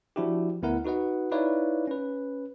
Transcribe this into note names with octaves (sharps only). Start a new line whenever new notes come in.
F3 D4 E4 F#4 G4
D2 B3 E4 A#4 F#5
D#4 F#4 B4 D#5 F#5
D#4 E4 B4 C#5 D5 F5
C#4 B4